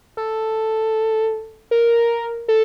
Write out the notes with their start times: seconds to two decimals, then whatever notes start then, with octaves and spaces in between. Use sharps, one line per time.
0.17 A4
1.71 A#4
2.48 A4